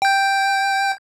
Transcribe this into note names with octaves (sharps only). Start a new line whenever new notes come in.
G5 G6